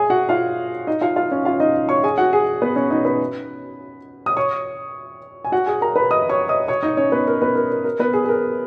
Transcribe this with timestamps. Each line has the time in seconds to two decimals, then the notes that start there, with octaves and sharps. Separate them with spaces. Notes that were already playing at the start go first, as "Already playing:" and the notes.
Already playing: G#4 G#5
0.10 F#4 F#5
0.29 F4 F5
0.87 D#4 D#5
1.01 F4 F5
1.16 F4 F5
1.32 C#4 C#5
1.45 F4 F5
1.60 D#4 D#5
1.89 C#5 C#6
2.03 G#4 G#5
2.18 F#4 F#5
2.33 G#4
2.62 B3 B4
2.76 C#4 C#5
2.90 D#4 D#5
3.05 B4 B5
4.26 D#6
4.37 C#5 C#6
5.45 G#5
5.52 F#4 F#5
5.66 G#4 G#5
5.81 A#4 A#5
5.96 B4 B5
6.11 D#5 D#6
6.29 C#5 C#6
6.49 D#5 D#6
6.68 C#5 C#6
6.83 D#4 D#5
6.97 C#4 C#5
7.12 B3 B4
7.27 A#4
7.42 B3 B4
7.55 A#4
7.71 A#4
7.84 A#4
7.99 B3 B4
8.13 G#4
8.25 G#4
8.29 A#4